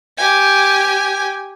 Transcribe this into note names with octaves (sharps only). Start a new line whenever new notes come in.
G4 G#5